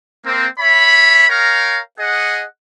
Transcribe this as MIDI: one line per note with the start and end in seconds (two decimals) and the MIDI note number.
0.25 0.46 58
0.25 0.46 60
0.59 1.27 73
0.59 1.27 76
0.59 1.27 83
1.29 1.79 70
1.29 1.79 73
1.29 1.79 77
1.29 1.79 79
1.29 1.79 82
1.99 2.44 68
1.99 2.44 75
1.99 2.44 78